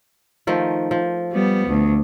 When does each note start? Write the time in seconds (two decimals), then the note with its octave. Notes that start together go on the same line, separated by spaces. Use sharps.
0.47 D#3 F3 A3
0.91 F3
1.32 G3 B3
1.68 D2